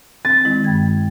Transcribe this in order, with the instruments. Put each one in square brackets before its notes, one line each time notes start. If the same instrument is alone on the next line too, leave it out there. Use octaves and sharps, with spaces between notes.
[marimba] C4 [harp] A6
[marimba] D#3 G#3 E4
G2 G5 G#6